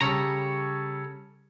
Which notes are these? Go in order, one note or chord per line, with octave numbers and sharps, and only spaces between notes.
C#3 G3 A4 C#5 A#5